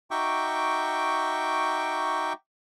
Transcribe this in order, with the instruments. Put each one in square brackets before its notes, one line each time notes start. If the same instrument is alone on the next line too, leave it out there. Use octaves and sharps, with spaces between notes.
[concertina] D#4 F#4 E5 G5 C#6 D6